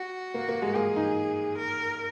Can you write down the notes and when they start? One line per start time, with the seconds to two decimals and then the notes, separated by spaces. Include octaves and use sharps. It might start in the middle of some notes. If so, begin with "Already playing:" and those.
Already playing: F#4
0.34 A#3
0.48 A#3
0.62 G#3
0.75 A#3 G#4
0.96 D#4
1.58 A#4